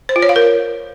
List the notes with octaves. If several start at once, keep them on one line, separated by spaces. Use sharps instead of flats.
C5
F4
C#5
F5
A#4